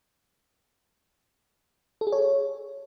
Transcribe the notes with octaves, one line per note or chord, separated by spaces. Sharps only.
A4
G#4
C#5